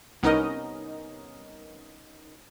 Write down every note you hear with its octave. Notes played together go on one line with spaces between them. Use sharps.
C2 B3 C#4 D#4 A#4 D#5